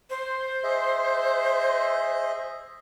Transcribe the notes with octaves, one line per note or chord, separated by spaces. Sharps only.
C5
G#4 D#5 E5